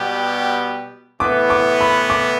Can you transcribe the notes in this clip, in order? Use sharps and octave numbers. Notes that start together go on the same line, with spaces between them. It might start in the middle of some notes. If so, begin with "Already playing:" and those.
Already playing: B2 G3 B3 G4
A2 E3 B3 D6
D6
B5
D6